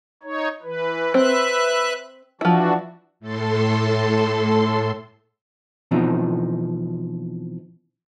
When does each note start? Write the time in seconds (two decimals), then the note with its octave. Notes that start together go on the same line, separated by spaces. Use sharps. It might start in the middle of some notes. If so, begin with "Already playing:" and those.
0.23 D#4 C#5
0.63 E3 B4
1.14 C4 B4 E5 F#6
2.41 E3 F3 D4 E4 F#4
3.20 A2 A4 C6
5.91 B2 E3 F3 C4 D#4